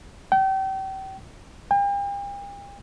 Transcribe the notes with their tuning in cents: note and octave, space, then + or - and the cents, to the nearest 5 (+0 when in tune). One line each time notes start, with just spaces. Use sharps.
G5 -35
G5 +40